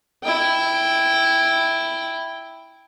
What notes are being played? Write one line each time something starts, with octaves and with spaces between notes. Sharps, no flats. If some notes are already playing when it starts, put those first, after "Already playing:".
E4 G5